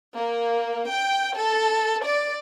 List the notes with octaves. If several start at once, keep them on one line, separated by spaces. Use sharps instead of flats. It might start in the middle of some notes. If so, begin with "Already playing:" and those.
A#3
G5
A4
D5